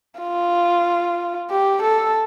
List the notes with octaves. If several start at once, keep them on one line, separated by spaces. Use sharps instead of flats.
F4
G4
A4